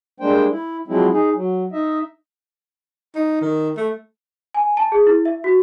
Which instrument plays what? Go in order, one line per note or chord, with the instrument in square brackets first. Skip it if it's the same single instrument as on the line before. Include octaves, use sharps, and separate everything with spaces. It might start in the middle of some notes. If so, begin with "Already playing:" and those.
[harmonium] G3 G#3 A#3 D4 C5 G5
E4
F3 F#3 G#3 C4 E4
D#4 G#4
F#3
D#4 D#5 E5
[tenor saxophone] D#4
D#3
A3
[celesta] G#5
A5
G#4
E4
E5
F#4